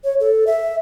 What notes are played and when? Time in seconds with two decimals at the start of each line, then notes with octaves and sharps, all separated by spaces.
0.04 C#5
0.20 A4
0.47 E5